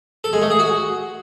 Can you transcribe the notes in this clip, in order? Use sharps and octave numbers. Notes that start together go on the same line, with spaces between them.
A4
G#3
A3
G#4
F#4